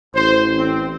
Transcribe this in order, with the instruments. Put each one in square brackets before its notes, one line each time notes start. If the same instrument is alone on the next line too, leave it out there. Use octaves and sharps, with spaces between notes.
[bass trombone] A1 [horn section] C5
[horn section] C4